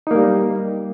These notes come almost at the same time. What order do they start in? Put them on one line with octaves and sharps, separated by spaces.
D#4 A#3 G3